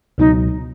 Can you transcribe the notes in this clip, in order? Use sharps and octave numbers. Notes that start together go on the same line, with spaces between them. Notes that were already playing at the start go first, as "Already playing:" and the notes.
C#2 B2 F#3 D#4